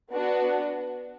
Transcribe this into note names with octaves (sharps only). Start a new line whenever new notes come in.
B3 D4 F#4